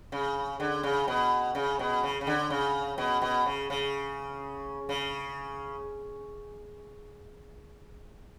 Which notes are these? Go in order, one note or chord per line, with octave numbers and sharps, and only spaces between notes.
C#3
D3
C#3
B2
C#3
B2
C#3
C#3
D3
C#3
B2
B2
C#3
C#3
C#3